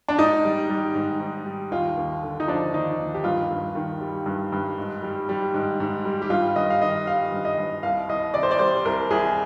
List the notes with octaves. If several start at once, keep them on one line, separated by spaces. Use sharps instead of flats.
D4
G#2 D#4
G3
G3
G#2
G#2
G3
D#2 F4
D#2
D3
D#4
F3 D4
D#2 D#4
D#2
G4
G2 F4
G2
D#3
G3
G2
G2
G#2
G3
G3
G#2
G#2
G3
G4
G2 F4
G2 D#5
F5
D#3 D#5
G3 F5
G2
D#5
G2
C2 F5
C2 D#5
C3 D5
C5
D5
G3 C5
C2 A#4
C2 G#4